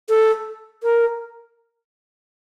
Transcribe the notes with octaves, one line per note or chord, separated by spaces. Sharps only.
A4
A#4